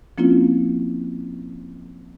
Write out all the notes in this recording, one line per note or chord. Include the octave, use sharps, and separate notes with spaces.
F3 A#3 C4 C#4 E4 F4